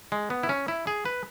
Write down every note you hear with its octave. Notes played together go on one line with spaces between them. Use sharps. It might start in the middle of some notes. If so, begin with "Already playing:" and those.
G#3
B3
E4
C#4
E4
G#4
B4